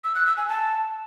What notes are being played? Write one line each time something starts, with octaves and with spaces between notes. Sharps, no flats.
E6
F#6
E6
G#5
A5